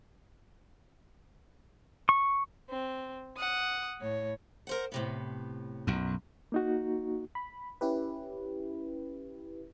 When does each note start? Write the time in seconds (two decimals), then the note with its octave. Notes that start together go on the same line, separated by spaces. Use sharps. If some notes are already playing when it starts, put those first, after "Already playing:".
2.09 C#6
2.71 C4
3.37 F#5 D#6
4.01 A2 C#5
4.67 A#4 C5 F#5
4.92 A2 C3 B3
5.87 B1 F#2
6.52 A#3 D#4 F#4
7.35 B5
7.81 C#4 E4 G4 B4